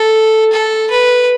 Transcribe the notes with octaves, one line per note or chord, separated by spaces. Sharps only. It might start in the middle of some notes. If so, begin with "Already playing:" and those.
Already playing: A4
A4
B4